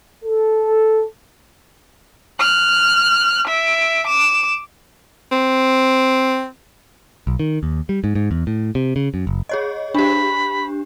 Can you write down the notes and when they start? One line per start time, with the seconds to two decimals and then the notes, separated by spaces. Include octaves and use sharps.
0.24 A4
2.39 F6 F#6
3.47 E5 D7
4.07 D6 E7
5.32 C4
7.27 B1
7.40 D#3
7.63 D#2
7.89 G3
8.04 G#2
8.15 G#2
8.31 E2
8.47 A2
8.75 C3
8.96 C#3
9.14 F#2
9.27 F#1
9.49 G#4 C#5 D#5
9.94 D4 G4 B5